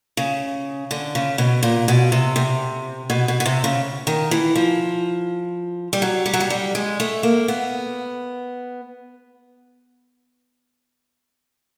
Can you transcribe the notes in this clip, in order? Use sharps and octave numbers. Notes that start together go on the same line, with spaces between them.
C#3
D3
C#3
B2
A#2
B2
C3
C3
B2
B2
B2
C3
C#3
D#3
E3
F3
G3
F#3
G3
F#3
G3
G3
G#3
A3
A#3
B3